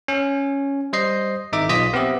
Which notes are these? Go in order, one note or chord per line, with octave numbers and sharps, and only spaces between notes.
C#4
G3 C5 D#5 C7
G#1 D#4 E5 D6
B1 F4 D#5 D#6 B6
B3 C4 G4 E5